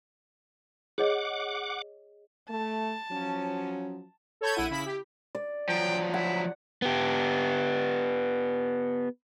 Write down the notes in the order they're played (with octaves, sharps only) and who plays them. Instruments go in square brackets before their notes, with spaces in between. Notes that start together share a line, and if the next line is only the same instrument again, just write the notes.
[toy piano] G#4 C#5 D#5 [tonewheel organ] F#5 D6
[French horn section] A3 [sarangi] A5
[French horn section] F3 F#3 C#4
[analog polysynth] A4 C#5 A5 B5 G6 G#6
A#1 E4 F#5 D#7
C#3 E4 B5 B6
G4
[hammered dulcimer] D5
[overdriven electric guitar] F3 F#3 [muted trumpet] G5
[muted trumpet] E4 [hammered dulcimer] F#5
[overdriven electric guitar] B3 G4